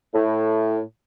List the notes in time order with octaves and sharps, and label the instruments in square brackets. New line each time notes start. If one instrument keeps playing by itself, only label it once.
[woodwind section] A2